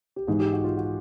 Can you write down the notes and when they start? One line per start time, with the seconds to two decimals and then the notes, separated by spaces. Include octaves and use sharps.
0.16 G4
0.27 G#2 E3 G#3 G#4
0.40 G4
0.53 F#4
0.64 F4
0.77 F#4